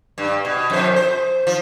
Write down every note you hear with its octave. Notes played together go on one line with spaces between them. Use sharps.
G2
B2
F2 C5
C5
F3